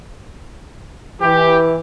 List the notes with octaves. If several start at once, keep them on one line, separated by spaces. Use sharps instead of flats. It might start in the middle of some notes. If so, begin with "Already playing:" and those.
E3 G4